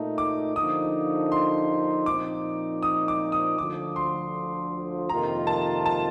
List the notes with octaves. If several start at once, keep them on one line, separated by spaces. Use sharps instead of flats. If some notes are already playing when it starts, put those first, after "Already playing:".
Already playing: A#2 A3 D#4
D6
D3 F3 A#3 D#4 D#6
C6
A#2 F3 C4 D#4 D6
D#6
D6
D#6
D2 D3 F3 D6
C6
F2 C3 D#3 A#3 F4 A#5
A5
A5